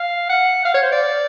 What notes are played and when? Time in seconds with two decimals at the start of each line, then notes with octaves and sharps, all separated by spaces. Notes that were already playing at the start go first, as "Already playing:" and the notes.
Already playing: F5
0.29 F#5
0.65 F5
0.74 C#5
0.82 C5
0.92 D5